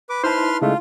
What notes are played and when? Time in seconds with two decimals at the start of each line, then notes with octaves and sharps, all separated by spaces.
0.10 B4 D6
0.24 D#4 E4 B4 C5 A5 C6 F6
0.62 C#3 G#3 A3 F4